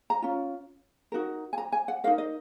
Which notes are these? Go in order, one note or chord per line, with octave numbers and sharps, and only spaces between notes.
A#5
C#4 F4
D#4 F#4 A#4
G#5
A#5
G#5
F#5
D#4 F#4 A#4 F5
D#5